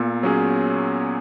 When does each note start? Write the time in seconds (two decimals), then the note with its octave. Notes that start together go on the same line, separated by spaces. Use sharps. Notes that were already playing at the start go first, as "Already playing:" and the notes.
Already playing: A#2 B3
0.23 F#3 C#4 G#4